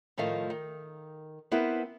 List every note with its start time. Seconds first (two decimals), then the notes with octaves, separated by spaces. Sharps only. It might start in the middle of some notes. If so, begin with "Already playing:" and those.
0.18 A2 D#3 F3 A3 D#5 F5
0.50 D#3
1.51 B3 C4 E4 A#4 B4